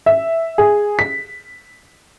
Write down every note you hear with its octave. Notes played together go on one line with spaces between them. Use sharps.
E5
G#4
B6